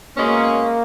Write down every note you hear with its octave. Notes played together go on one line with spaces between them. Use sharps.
B2 G#3 A#3 C#4